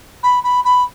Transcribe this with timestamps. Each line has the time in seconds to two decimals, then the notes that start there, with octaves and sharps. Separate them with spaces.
0.23 B5
0.44 B5
0.65 B5